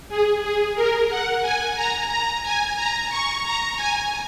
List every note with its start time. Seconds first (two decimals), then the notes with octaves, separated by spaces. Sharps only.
0.09 G#4
0.42 G#4
0.75 A#4
1.09 F#5
1.42 G#5
1.75 A#5
2.08 A#5
2.43 G#5
2.76 A#5
3.09 C#6
3.43 A#5
3.76 G#5